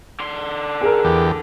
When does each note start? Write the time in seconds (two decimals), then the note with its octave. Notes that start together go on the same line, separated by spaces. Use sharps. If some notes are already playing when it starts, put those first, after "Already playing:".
0.19 D3 C6
0.81 G#4 A#4
1.05 E2 G4